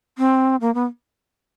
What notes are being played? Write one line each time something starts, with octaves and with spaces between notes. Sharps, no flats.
C4
A#3
B3